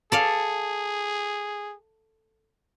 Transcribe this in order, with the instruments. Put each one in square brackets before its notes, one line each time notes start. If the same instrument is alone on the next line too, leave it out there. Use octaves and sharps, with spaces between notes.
[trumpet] G#4 [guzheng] A4 D5 F5